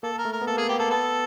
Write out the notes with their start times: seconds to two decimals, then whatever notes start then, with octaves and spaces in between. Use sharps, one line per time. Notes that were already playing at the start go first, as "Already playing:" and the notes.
0.03 A#3 A4
0.18 A#4
0.25 A3
0.33 A#4
0.41 B3
0.47 A#3 A4
0.57 A#3 G#4
0.69 B3 G4
0.79 A#3 A4
0.90 B3 A4